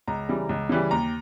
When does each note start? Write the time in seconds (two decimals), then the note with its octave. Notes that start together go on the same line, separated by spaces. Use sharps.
0.07 C#2 A#5
0.29 C#3 E3 G3
0.49 C#2
0.69 C#3 E3 G3
0.91 D#2 A#5